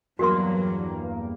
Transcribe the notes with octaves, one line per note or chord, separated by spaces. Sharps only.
E2 G2 F#3 A#3 F#4 A#4 C6